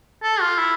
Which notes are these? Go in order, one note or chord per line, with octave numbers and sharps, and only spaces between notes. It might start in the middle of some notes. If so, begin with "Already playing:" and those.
A4
F4
E4